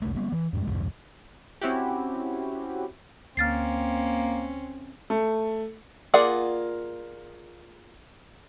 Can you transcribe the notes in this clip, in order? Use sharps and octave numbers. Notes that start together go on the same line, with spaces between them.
F1 C2 A3
G3 A#3 B3
E3
F2 G#2 G#3
C2 F2 G#2
C4 C#4 E4 F#4 G4
D2 A#3 C4 C#4 F6 A6 C7
A3
A#3 F4 G#4 D5 F#5